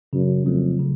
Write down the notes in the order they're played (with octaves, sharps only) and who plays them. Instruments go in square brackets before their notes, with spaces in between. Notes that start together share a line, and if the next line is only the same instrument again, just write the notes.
[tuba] F#2 [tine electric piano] C#3
[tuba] F2 [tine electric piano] F#3 A3
[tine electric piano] C#3